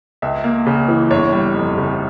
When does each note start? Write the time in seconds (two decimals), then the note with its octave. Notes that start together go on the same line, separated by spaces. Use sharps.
0.22 C#2 E5
0.44 A#3
0.67 C#3
0.88 E3
1.10 G1 C#5
1.33 G3
1.54 F2
1.77 C#3